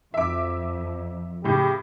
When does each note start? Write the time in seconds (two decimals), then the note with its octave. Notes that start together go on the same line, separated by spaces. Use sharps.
0.14 F2 E5 D6
1.44 A2 C#3 G4